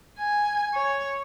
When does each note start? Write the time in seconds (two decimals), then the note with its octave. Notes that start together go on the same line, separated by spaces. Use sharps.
0.18 G#5
0.75 C#5